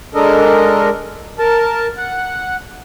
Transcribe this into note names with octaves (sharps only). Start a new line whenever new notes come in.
G#3 D4 A4 A#4 D#5
A#4 A5
F#5